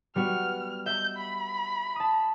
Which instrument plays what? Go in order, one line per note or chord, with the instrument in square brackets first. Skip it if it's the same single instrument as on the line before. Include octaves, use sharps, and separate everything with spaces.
[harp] G3 B3 F#4 [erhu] F6
[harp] E5 [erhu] G6
[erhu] B5
[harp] A5 D#6